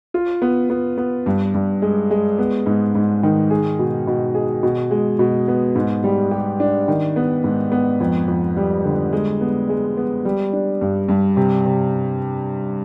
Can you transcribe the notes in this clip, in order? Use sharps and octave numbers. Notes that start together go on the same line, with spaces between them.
F4
B3
B3
B3
G2
G2
G#3
G#3
B3
G#2
G#2
D#3
G#4
B2
B2
G#4
B2
G#3
B2
B3
G#2
G3
G4
D4
D#3
B3
G#2
B3
F2
F2
G3
D3
G#3
B3
G#3
B3
G3
D4
G2
G2
C3
C3